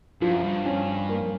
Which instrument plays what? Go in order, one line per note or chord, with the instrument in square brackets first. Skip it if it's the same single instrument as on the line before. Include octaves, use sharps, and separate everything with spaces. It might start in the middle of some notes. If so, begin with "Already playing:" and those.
[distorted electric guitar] G2 [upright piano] F3
[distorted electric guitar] F#2
G2
[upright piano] C#4
A#3